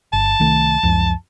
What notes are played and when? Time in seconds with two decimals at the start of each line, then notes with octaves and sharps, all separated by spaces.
0.13 G1 A5
0.40 C2 D#3 A3
0.83 C#2 F#2 F3